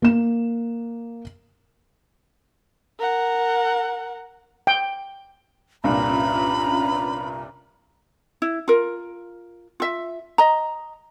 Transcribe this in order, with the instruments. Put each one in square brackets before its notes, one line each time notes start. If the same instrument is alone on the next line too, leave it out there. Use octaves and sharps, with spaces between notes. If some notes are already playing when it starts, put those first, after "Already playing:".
[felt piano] A#3 E7
[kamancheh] A#4 F#5
[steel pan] G5
[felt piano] C2 G2 A#2 [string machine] C#4 F4 B4 [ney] A#5 [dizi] B5
[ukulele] E4
F4 A#4
F4 E5
D#5 A#5